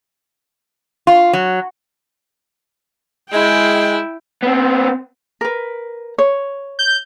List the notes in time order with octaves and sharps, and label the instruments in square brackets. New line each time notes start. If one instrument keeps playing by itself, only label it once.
[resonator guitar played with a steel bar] F4
F#3
[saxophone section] G#3 [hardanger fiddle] E4 [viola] G5
[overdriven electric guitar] B3 C4
[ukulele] A#4 B4
C#5
[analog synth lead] G6